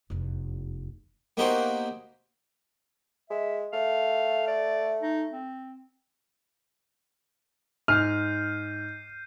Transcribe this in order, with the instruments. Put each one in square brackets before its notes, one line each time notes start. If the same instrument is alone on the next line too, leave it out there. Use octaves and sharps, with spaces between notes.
[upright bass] F1 E2
[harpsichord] A#3 B3 D#4 F#4 G4 C5
[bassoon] G#3 [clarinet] E5
[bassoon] A3 [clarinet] F5
[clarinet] D5
D#4
C4
[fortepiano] G#2 [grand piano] F6 [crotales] G6 C7 D#7